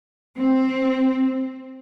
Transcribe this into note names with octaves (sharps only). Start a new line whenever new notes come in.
C4